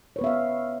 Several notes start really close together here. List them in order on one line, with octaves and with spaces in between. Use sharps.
C#5 B4 B3 E5 F5